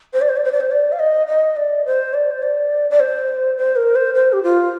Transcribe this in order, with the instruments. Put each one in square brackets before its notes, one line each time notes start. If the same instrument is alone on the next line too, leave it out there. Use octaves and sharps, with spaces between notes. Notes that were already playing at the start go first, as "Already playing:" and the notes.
[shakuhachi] C5
D5
C5
D5
C5
D5
C5
D5
F5
D#5
D#5
D5
C5
D5
C5
D5
D5
C5
C5
A#4
C5
C5
G4
F4